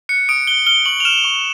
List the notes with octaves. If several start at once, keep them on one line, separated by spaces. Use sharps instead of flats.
F#6 C#7
D#6 D7
F#6 G7
F6 G7
C#6 F#7
F7
F6 E7
C#6